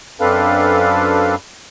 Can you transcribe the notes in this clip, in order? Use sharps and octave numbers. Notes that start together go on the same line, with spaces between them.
F#2 C4 D4 A4 B4 F5